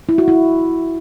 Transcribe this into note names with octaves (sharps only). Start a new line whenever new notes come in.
E4
F#4
E4